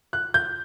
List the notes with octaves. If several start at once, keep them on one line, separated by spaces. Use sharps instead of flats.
F#6
G6